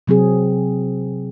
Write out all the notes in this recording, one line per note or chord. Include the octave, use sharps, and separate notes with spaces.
C3 F#3 C4 G#4